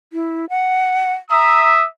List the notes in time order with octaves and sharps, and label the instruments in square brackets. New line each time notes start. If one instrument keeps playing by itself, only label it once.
[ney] E4
F#5
[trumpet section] E5 D#6 [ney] A#5